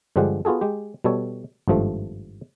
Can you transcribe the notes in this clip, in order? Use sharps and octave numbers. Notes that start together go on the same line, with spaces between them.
G2 D3 F3 G#3 G4 F#5
B3 F4 F#4 G#4 A4
G#3 G4
B2 G3 A4 C#5
G#1 G2 F3 A3